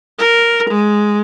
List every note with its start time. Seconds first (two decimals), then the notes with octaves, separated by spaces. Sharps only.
0.19 A#4
0.70 G#3